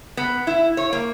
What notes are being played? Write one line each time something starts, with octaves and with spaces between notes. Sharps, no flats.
B3
E4
C#5
A#3